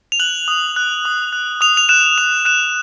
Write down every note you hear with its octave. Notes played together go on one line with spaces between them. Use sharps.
F7
F#6 F#7
D#6
F#6
D#6
F#6
D#6 F7
F7
F#6 E7
D#6 F7
F#6 E7